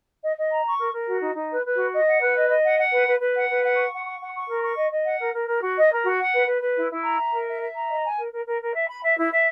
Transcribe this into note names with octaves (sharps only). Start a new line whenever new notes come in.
D#5
D#5
A#5
C#6
A#4
A#4
F#4
D#4
D#4
B4
B4
F#4
D#5
F#5
B4
D#5
D#5
F#5
F#5
B4
B4
B4
F#5
B4
F#5
C#6
F#5
C#6
F#5
C#6
A#4
C#6
D#5
D#5
F#5
A#4
A#4
A#4
F#4
D#5
A#4
F#4
F#5
B4
B4
B4
E4
E4
A#5
E5
A#4
E5
E5
A#5
D#5
G#5
A#4
A#4
A#4
A#4
E5
B5
E5
E4
E5